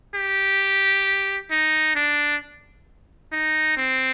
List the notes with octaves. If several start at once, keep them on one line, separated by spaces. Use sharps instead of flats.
G4
D#4
D4
D#4
C4